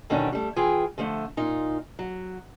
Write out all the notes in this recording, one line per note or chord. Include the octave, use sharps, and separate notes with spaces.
B2 D3 D#3 G3 C#4 D4
G3 A3
E3 F4 G#4 G5 G#5
D3 F3 A3
A#2 D#4 F4
F#3